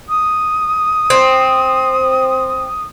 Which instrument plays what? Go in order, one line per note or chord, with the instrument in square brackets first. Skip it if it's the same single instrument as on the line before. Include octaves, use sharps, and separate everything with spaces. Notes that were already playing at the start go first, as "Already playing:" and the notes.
[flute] D#6
[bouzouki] C4